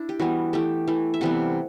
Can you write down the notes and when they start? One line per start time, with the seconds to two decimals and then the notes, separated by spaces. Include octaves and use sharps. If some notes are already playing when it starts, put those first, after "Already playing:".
Already playing: D4 E4
0.09 G4
0.20 E3 G3 B3 F#4
0.53 E3 A3 G4
0.88 E3 A3
1.14 E5
1.21 C3 E3 G3 B3 F#5